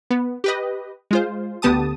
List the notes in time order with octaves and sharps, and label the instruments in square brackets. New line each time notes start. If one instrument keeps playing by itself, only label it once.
[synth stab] B3
G4 B4 D#5
G#3 F4 C5
D2 D3 B3 G4 A5 D#6